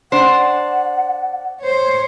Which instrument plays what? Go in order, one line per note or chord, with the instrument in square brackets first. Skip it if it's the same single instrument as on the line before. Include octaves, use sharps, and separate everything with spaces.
[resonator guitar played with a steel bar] D4 C5 [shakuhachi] F#5
[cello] C5 C#5